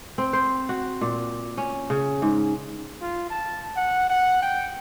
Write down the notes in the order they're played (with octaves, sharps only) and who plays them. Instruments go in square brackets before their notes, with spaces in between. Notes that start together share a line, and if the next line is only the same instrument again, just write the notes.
[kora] C4
C5
F#4
A#2
C#4
C#3
G#2
[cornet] F4
A5
F#5
F#5
G5